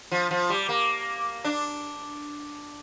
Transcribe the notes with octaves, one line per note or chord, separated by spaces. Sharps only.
F3
F3
G3
A#3
D4